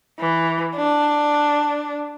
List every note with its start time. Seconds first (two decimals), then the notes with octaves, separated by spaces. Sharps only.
0.20 E3
0.76 D4